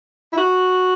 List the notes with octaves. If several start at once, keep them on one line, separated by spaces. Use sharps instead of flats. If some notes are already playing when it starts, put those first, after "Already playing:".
E4
F#4